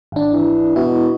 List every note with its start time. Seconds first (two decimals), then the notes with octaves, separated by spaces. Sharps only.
0.12 G#1 D4
0.32 E3
0.76 B2 E4